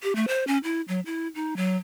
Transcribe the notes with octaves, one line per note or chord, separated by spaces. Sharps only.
G4
A3
C5
C#4
E4
F#3
E4
D#4
F#3